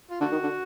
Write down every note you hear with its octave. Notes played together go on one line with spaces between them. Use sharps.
F4
D3 A3 F#4
D#3
D3